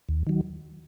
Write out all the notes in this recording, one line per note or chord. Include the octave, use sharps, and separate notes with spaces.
D#2
D#3 F#3